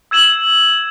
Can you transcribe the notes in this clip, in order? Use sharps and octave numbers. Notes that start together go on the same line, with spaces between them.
E6 G#6 E7 F#7